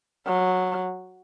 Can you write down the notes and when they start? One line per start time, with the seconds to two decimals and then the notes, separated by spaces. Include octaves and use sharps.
0.27 F#3